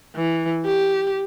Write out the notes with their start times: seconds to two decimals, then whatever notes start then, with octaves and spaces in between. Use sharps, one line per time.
0.16 E3
0.66 G4